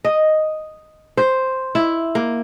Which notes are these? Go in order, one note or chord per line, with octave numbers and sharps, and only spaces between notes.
D#5
C5
E4
A#3